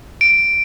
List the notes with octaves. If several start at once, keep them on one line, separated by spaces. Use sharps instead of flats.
D7